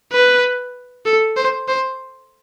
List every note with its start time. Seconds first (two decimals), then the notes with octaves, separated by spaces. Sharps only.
0.12 B4
1.06 A4
1.37 C5
1.68 C5